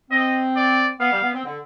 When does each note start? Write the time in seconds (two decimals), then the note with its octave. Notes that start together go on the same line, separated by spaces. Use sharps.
0.11 C4 D#5
0.56 D5
1.00 B3 F5
1.12 G3
1.22 B3
1.34 C4
1.45 D3